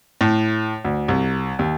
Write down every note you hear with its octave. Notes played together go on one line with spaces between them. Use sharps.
A2
D2
C2
D#2